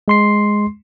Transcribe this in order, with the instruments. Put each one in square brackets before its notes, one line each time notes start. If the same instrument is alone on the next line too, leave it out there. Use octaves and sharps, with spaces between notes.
[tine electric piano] G#3 C6 C7